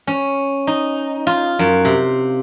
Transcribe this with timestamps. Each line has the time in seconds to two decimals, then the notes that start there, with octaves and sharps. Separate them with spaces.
0.07 C#4
0.67 D#4
1.27 F4
1.59 F#2
1.85 C3